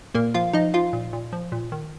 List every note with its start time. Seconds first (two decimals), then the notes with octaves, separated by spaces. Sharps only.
0.15 A#2 A#3 A#4
0.34 F3 F4 F5
0.53 F3 D#4 D#5
0.74 F3 F4 F5
0.93 A#2
1.13 A#2
1.33 F3
1.52 A#2
1.72 D#3